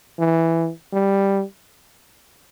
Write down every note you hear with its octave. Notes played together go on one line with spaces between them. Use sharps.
E3
G3